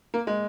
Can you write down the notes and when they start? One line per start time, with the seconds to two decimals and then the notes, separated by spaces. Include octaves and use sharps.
0.14 A#3
0.27 G#3